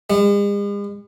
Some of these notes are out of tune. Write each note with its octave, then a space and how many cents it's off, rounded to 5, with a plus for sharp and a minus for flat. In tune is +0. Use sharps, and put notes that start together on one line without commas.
G#3 -45